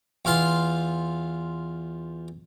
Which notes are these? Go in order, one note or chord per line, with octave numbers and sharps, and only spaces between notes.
E2 F4 F5 C6